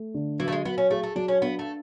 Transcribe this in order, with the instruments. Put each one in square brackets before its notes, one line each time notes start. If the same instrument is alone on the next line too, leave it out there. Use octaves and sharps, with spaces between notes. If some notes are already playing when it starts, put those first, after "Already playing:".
Already playing: [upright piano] A3
D3
[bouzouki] E3 [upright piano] F#3
[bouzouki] A3
G#3
[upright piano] F#3 [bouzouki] B3
[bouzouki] C#4
[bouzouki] A3 [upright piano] G#4
[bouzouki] A3
[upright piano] F#3 [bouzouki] D4
[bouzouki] C#4
[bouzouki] B3 [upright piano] D4
[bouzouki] A3